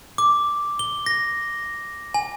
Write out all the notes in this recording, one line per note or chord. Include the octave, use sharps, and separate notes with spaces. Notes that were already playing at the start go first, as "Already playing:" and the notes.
D6
G7
A#6
G#5